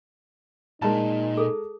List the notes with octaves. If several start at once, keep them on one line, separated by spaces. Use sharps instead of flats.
A#2 G#3 D#4 A#4 A5
G#4 A4